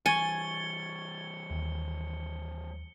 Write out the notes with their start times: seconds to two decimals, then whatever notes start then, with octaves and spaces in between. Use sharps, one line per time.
0.06 E3 G3 G#5 C#6 G#6 A6 C#7 G7
1.50 D#2